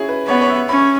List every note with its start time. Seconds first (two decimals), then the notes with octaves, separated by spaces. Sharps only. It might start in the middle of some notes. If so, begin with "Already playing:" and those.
Already playing: C#4 E4 F#4 G#4
0.09 B4
0.28 B3 C#5
0.41 C#5
0.49 E5
0.69 C#4 B5